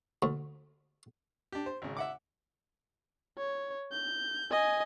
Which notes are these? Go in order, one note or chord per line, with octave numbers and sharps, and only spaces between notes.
D2
D4 G4
C5
G#1 C#3
E5 F#5 D6
C#5
G6
D#5 G#5